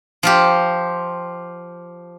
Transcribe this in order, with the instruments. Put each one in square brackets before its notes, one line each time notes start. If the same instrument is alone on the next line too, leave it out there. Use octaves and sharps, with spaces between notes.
[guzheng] F3 F4 G4